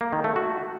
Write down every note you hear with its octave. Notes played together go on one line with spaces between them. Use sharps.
A#3
D#3
A3
F#4